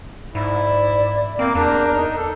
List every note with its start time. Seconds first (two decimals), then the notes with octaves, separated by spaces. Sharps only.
0.35 G#2 E4 D5
1.39 A#3 C4
1.55 E2 D4 A#4 A#5 G6
1.96 D#4
2.17 A4